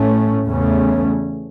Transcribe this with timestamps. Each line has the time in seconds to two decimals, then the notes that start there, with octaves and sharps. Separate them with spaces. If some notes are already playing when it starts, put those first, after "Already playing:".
Already playing: A2 A3 C#4
0.46 E2 C#3 A3 C#4